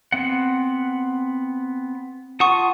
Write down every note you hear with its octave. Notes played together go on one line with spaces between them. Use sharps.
B3 C4 F#5
F4 F#5 A5 C#6 D#6